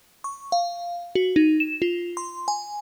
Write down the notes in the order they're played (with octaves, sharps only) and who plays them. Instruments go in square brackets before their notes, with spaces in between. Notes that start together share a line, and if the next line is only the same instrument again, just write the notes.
[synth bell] C#6
F5
F#4
D#4
E7
F4
C6
G#5